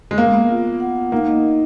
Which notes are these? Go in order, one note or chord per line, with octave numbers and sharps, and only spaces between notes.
G#3
A#3 B3
B3
F4
B3
F#5
F#5
A#3 D#4
D#5
D#5